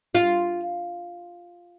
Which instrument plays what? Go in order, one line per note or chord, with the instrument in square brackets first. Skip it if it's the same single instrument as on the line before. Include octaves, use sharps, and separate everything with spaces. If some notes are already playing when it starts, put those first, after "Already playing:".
[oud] F4